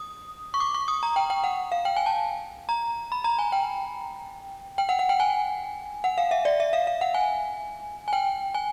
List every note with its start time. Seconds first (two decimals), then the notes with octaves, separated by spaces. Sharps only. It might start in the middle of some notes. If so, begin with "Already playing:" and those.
Already playing: D#6
0.54 C#6
0.60 D6
0.74 C#6
0.88 D#6
1.03 A#5
1.16 G5
1.30 G5
1.44 F#5
1.72 F5
1.85 G5
1.96 G#5
2.06 A5
2.69 A#5
3.12 B5
3.24 A#5
3.39 G#5
3.52 G5
4.78 G5
4.89 F#5
4.99 F#5
5.09 G5
5.20 G#5
6.04 F#5
6.18 F5
6.31 E5
6.45 D5
6.60 E5
6.73 F5
6.87 F5
7.01 F#5
7.14 G#5
8.08 G#5
8.13 G5
8.54 G#5